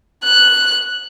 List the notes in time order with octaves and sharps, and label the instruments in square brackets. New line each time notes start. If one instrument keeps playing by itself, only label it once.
[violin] F#6